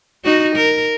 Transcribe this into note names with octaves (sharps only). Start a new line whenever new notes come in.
D#4 F#4
A#4